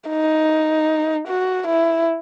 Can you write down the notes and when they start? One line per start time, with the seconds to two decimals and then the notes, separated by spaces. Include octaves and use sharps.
0.09 D#4
1.28 F#4
1.67 E4